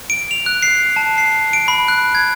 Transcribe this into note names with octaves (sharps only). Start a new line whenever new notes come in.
D7
F7
F#6
C7
A5
C7
D7
B5
F#6
G#6